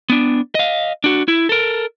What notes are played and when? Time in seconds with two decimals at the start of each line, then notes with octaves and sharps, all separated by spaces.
0.10 B3 D4
0.55 D#5 F5
1.04 D4 F#4
1.28 E4
1.49 A4 A#4